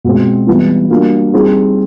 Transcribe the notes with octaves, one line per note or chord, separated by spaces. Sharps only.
B2 G#3 C4
E3 G3 B3 E4
G3 A#3 D4 F#4
G3 C4 D#4 G#4